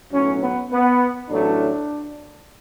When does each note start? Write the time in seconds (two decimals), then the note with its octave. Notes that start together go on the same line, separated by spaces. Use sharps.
0.12 B1 A2 F#3 C#4
0.41 B3
0.71 B3
1.29 A1 A2 F#3 A3 D4